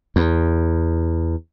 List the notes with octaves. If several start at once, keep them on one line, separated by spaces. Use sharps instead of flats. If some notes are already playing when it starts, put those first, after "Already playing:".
E2